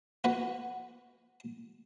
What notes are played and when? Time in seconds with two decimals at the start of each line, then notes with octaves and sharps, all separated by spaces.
0.24 F#4 B4 F#5